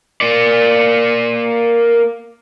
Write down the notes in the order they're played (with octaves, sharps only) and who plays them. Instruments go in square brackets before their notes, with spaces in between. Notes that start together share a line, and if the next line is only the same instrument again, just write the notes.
[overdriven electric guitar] A#3 D5